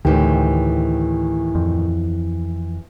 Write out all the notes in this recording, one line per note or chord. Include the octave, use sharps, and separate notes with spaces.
D2 A2 D#3 E3 G4
F2